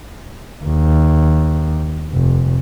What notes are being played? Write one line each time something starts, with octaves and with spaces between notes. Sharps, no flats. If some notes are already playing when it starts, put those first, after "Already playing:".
D#2
F1